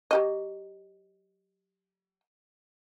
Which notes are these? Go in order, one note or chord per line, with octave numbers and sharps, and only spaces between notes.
F#3 G4 D#5